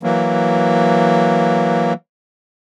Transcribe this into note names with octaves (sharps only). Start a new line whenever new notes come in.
E3 F#3 A#3